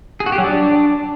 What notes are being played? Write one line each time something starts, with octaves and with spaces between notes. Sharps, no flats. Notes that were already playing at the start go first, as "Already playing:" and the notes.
G#4
F#4
G4
F#3
D4